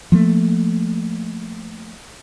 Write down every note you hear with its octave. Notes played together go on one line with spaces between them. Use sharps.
F3 F#3 A3 A#3